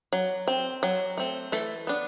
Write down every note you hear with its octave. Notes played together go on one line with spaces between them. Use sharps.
F#3
C4
F#3
A3 C4
E3 A3 A4
B3 D4